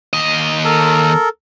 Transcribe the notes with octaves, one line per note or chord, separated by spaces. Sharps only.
D#2 D#5
A4 A#4